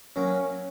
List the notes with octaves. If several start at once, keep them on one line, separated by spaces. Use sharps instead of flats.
F#3 A#3 C#4